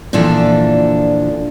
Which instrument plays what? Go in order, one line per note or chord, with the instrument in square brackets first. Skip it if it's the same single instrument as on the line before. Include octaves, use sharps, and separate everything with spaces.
[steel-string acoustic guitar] A#2 D3 E3 F3 D4 A4